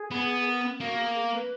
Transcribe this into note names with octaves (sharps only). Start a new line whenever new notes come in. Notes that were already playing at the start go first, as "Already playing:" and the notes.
Already playing: G#4
B3
A#4
A#3 F#4
G#4
A#4
B4